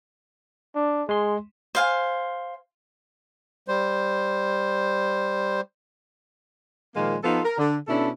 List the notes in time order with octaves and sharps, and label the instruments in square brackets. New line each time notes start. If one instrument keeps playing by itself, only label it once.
[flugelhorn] D4
[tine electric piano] G#3 C6 [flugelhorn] G#4
[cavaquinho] C5 F5 G#5
[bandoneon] G3 C5
[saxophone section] A#2 D#3 F3 G#3 A#3
F3 B3 D#4 F4 G4 A4
A#4
D3
B2 C#4 D4 E4 A4